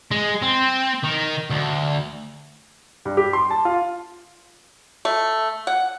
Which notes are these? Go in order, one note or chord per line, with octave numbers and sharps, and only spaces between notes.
G#3
C4
D#3
D2
G2
G4
C6
A5
F4
A3
F#5